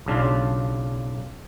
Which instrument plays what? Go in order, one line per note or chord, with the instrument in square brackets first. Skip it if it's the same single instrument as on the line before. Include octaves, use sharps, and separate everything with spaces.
[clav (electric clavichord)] B1 C#3 D4 F4